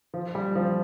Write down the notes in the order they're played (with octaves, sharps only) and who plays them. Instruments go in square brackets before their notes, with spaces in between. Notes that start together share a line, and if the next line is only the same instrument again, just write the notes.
[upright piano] F3
G3
F3